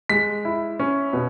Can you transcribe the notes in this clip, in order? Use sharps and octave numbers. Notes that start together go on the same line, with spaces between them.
G#3 B6
E4
C#4
B2